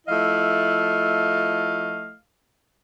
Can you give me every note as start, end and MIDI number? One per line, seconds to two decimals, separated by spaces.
0.07 2.13 53
0.07 2.13 57
0.07 2.13 64
0.07 2.13 75
0.07 2.13 77